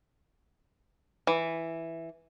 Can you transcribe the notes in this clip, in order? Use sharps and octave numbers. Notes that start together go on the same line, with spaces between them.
E3